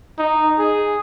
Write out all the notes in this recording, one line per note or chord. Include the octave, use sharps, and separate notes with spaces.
D#4
G#4